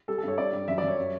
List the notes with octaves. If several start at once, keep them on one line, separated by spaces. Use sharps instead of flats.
G3 A4
A4
G2 C#5
G2 D5
G3
F#2 E5
D5
F#2
C#5
G3